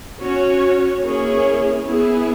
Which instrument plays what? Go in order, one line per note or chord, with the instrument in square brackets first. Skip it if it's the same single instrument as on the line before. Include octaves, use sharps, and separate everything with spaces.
[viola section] C#4 F#4 C#5
A#3 C#4 E4 G#4 C#5
B3 E4 G#4